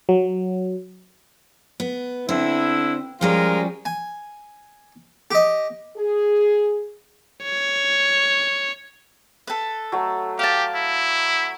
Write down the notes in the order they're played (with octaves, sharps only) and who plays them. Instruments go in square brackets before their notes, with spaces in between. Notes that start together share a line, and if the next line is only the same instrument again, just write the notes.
[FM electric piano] F#3
[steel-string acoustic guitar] B3
[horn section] D3 E4 [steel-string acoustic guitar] C4
[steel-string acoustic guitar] F3 G3 C#4 [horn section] G#3 F4 A#4
[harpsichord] G#5
G4 D#5
[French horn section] G#4
[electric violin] C#5
[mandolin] A4 B4
[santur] F#3 A3
[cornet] G4 [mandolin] F5 A5
[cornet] E4